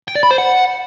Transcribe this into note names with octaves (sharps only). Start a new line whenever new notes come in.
G5
D5
B5
C5
F#5